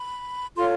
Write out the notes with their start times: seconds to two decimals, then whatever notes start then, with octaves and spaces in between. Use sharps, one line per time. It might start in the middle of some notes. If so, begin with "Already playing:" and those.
Already playing: B5
0.55 F4 A4 C#5 C6